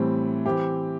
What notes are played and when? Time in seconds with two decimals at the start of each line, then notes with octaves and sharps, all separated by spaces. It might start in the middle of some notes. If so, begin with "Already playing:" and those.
Already playing: A2 E3 G3 C4
0.46 E3 C4 G4